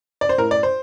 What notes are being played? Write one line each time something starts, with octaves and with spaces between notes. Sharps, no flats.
D5
C5
A2 A#4
D5
C5